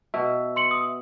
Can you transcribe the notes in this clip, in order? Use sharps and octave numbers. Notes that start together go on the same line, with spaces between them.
B2 E5
C6 C#7 F#7
D#6